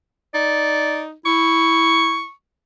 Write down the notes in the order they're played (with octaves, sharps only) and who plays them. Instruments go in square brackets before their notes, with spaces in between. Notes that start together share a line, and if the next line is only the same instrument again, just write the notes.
[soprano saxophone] D#4 [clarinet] D5
[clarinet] E4 [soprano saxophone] C#6